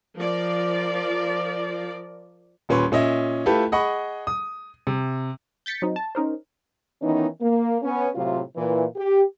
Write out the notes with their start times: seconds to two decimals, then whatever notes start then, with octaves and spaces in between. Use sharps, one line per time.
0.16 F3 A#4 D5
2.69 D#1 A#2 C#4 B4 C6 C#6
2.92 A#2 C#4 D#5 E5
3.46 A3 E4 F4 G4 A4 B4
3.72 G#4 D#5 F#5 B5 C#6
4.27 D#6
4.87 C3
5.66 G6 A6 B6 C#7
5.82 F#3 C4 D#4
5.96 A5
6.15 C#4 D#4 A#4 C5
7.02 D#3 E3 B3 C#4 D#4
7.40 A#3
7.82 B3 C#4
8.15 A2 C3 F#3 F4
8.56 A#2 E3
8.96 G4